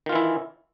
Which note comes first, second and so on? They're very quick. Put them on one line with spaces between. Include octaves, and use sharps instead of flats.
D#3 F4 E3 E4